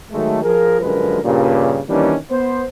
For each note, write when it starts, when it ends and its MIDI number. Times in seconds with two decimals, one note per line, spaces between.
0.12 0.42 51
0.12 0.42 54
0.12 0.42 56
0.12 0.42 57
0.43 0.81 53
0.43 0.81 68
0.43 0.81 70
0.82 1.20 42
0.82 1.20 50
0.82 1.20 53
0.82 1.20 56
0.82 1.20 70
0.82 1.20 71
1.23 1.80 43
1.23 1.80 46
1.23 1.80 49
1.88 2.15 51
1.88 2.15 52
1.88 2.15 55
1.88 2.15 58
1.88 2.15 61
1.88 2.15 62
2.31 2.63 59
2.31 2.63 72